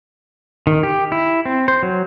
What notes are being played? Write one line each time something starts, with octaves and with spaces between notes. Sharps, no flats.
D#3
G4
E4
C4
C5
F#3